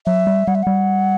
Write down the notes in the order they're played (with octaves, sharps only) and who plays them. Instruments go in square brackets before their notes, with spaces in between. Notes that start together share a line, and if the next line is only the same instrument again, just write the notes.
[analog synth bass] F#3 [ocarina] E5
[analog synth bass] G3
[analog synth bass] G3 [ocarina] F#5
[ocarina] E5
[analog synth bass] G3 [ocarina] F#5